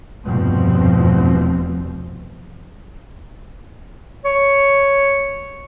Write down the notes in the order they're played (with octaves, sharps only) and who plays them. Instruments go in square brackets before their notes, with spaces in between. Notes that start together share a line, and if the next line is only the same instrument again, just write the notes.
[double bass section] F1 E2 G2 B2 F3 C4
[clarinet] C#5